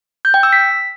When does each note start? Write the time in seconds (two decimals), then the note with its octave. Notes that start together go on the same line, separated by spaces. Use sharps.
0.25 G6
0.34 G5
0.43 E6
0.53 B6